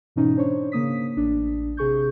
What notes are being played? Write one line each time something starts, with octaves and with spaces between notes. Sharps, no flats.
G#2 B2 E3 C#4 D#4
D4 C5 C#5
C#3 A#3 D#6 B6
A1 D4
C3 G#4 C#6 G6